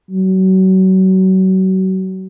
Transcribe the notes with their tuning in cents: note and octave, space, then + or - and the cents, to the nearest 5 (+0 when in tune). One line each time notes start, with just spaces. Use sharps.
F#3 +30